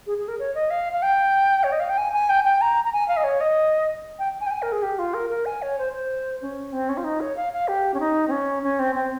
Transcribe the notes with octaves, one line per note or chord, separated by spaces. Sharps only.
G#4
G#4
A#4
C#5
D#5
F5
F5
G5
C#5
D#5
F5
G5
G#5
G#5
G5
G5
A#5
A#5
G#5
F5
D#5
C#5
D#5
G5
G#5
G5
G#5
A#4
G#4
G4
F4
A#4
A#4
G#5
C#5
C5
C5
C#4
C4
C#4
F4
D#4
C#5
F5
F5
G4
C#4
D#4
C4
C#4
C#4
C4
C4